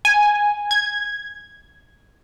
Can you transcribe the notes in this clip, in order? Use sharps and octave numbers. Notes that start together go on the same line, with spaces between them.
G#5
G#6